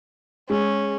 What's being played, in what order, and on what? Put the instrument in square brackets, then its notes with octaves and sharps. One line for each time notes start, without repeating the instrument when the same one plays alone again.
[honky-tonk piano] G#3 [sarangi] C#4